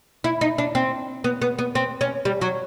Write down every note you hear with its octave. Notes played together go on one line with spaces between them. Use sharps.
E4
D#4
D4
C4
B3
B3
B3
C4
C#4
G3
F#3